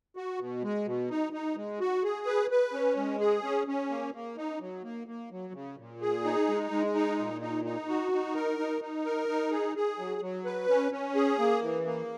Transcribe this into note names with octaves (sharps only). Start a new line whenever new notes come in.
F#4
B2
G#3
B2
D#4
D#4
G#3
F#4
G#4
B4
B4
C#4
G#3
G#4
C#4
C#4
A#3
A#3
D#4
F#3
A#3
A#3
F#3
C#3
A#2
G#4
D#4
G#3
G#3
D#4
A#2
D#4
D#4
F#4
D#4
A#4
D#4
D#4
A#4
D#4
G#4
G#4
F#3
F#3
B4
C#4
C#4
G#4
A#3
E3
A#3